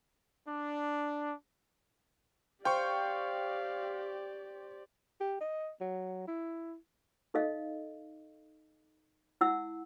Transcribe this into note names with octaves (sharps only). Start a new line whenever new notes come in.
D4
G4 C5 D5 F5 G5 C#6
G4
D#5
F#3
E4
D#4 A4 D#5 F5
E4 F#5 E6